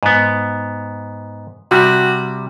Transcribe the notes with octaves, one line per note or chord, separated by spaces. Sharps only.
G#2 B3
C3 G3 F#4